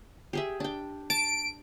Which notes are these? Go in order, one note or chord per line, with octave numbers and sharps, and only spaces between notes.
G4 G#4 E5
D4 G5
A5 D7